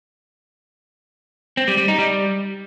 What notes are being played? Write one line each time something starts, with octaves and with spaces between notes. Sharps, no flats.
C4
G3
G3
D#4
G3